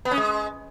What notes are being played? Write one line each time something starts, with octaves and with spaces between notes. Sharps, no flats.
B3
C#4
G#3